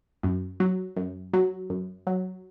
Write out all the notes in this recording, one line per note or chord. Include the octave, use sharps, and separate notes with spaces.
F#2
F#3
F#2
F#3
F#2
F#3